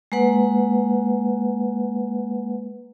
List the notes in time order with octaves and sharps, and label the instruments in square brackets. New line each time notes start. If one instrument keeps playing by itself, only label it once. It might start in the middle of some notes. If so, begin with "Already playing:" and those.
[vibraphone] G#3 A#3 B4 F#5